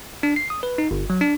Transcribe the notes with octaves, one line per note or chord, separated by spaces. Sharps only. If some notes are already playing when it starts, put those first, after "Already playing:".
D4
C7
D#6
B4
D#4
G1
F#3
D4